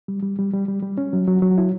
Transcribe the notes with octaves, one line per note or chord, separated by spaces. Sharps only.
G3
G3
G3
G3
G3
G3
C#4
F#3
F#3
F#3
E4